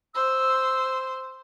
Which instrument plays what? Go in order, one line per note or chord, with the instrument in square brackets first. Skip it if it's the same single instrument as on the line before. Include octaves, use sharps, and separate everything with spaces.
[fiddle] C5 [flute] E6